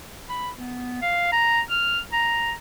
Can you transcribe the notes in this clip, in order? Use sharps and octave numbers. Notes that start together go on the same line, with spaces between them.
B5
B3
F5
A#5
F6
A#5